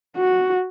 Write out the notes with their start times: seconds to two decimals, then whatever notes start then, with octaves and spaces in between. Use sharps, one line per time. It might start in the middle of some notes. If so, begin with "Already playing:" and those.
0.17 F#4